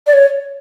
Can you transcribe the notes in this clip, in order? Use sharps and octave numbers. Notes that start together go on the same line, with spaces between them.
D5
C#5